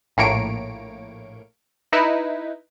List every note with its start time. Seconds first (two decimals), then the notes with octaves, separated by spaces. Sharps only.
0.17 A#1 A2 A#3 C#5 D7
1.93 D#4 E4 B4